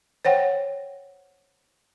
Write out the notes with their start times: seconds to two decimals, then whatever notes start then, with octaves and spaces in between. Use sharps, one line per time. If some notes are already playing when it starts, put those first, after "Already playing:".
0.25 C5 C#5 F#5 G5